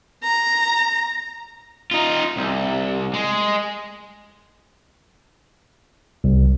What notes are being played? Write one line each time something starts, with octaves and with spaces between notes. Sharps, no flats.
A#5
D#4 F4
C2
G#3
C2